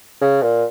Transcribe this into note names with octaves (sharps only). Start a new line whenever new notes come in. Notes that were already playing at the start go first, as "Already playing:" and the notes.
C#3
A#2